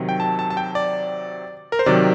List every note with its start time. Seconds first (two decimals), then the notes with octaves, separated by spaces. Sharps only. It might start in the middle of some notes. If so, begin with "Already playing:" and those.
Already playing: C3 D#3 F#3
0.09 G5
0.20 A5
0.39 A5
0.50 A5
0.57 G5
0.75 D5
1.72 A#4
1.79 C5
1.86 C3 D#3 F#3 D5